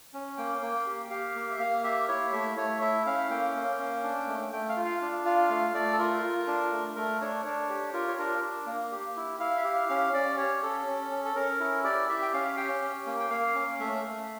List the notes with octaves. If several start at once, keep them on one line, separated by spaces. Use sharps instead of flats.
C#4
A#3 G5
A#3
G4
G4 F5
A#3
E5
A#3 F5
G4 E5
E4 C#5
A3 E5
A3 C#5
E4 E5
C#4 F5
A#3 G5
A#3
C#4
D4
A3
A3 G5
F5
F4
F5
D4
F4 F5
A3 F5
A3 D5
A4
F4 A#4
F4
D4
A3
A3 A#4
D4 C#5
D4 C#5
G4
F4 A#4
C#5
D4 A#4
D4
A#3
G4
E4
E4 F5
E5
G4 F5
C#4 F5
C#4 D5
G4 C#5
C#4 A4
C#4
C#4
A4
C#4 A#4
E4
G4 D5
G4 E5
G5
C#4 F5
G4 G5
C#4
A#3
G5
A#3 F5
C#4
A3 E5
A3